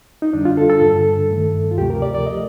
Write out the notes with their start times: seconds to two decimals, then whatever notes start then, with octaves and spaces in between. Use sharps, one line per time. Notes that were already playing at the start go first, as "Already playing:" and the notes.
0.22 D#4
0.33 F2 D3 G3 D4
0.45 F4
0.57 A4
0.70 A4
0.82 G2 D3 G3
1.30 G2 D#3 A3
1.71 F4
1.78 D2 C3 F3 A3 G4
1.90 A#4
2.02 D5
2.14 D5
2.26 F3 A3 D#5